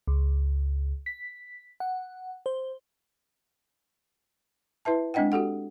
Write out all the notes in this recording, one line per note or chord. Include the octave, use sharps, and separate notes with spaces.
C#2
B6
F#5
C5
E4 B4 E5 A5
G#3 C4 D4 D#5 F#5 G5
F#4 G4 A4 F#5